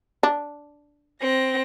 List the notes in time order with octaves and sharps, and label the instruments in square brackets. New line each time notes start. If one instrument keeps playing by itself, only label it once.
[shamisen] D4
[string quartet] C4 A#6